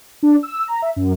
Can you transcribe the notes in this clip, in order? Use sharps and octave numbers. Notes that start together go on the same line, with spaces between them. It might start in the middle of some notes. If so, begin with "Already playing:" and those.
D4
E6
A#5
E5
F#2